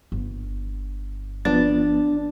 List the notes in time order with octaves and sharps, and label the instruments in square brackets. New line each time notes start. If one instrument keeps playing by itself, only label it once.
[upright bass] G1
[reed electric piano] F3 B3 A6 [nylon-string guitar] D4